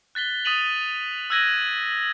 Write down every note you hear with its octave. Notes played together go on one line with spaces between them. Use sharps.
F#6 A6 B6 G7
D#6 A6 B6 D#7 F7 F#7
E6 F#6 G#6 A#6 D#7 F#7